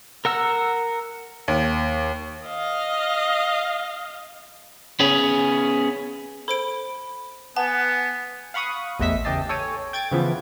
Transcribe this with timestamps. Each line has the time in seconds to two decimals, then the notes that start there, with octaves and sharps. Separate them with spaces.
0.25 A#4 F#5 E6
1.48 D#2
2.47 D#5 F5
5.00 B3 C#4 G#4
6.48 A4 C5 B5 D7
7.57 B3 B4 F#5 G#5 A5
8.54 F5 F#5 B5 C#6 D#6
8.99 A1 E2 D#5 E5 B6
9.24 C#3 E3 G4 D#5 A5 C7
9.49 A4 C#5 G5 G#5
9.93 G5 G#6 A6 D7
10.11 C#3 E3 F3 B3